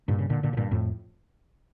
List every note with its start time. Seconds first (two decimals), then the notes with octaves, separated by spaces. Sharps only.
0.08 G2 A#2
0.19 C#3
0.30 A#2 D3
0.43 A#2 D3
0.53 C#3
0.57 G2 A#2
0.71 F2 A2